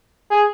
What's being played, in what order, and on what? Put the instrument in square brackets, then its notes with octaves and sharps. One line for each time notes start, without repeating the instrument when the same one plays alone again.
[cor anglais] G#4